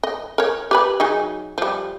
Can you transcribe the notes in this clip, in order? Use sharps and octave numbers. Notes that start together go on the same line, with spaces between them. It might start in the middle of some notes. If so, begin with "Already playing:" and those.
D#5
A#4 C#5
G4 B4 B5
F#3 D#4 G#4
F3 G3